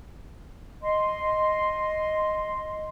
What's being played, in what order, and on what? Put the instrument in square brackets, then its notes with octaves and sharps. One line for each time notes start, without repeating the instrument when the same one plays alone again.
[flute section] D#5 C6